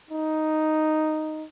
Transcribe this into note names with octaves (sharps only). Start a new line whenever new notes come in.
D#4